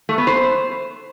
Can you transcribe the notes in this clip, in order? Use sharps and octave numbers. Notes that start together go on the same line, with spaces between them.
A3
B3
C5